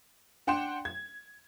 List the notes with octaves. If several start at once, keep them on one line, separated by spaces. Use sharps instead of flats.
D4 F#5 G5 C6 E7
G#6